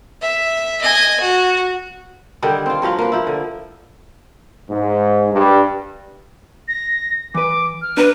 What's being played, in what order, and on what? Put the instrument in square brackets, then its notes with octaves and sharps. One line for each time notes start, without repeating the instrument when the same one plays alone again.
[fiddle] E5
D#5 G#5
F#4
[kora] D3 D#3 G3 D4
C4 F4
G2 F3 F#3 F4
A#3 B4
F3 E4
D3
[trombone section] G#2
G2
[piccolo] A#6
[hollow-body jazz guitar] E3 B4 [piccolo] D6
[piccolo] F6
[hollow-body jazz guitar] D4 A#5 [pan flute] B4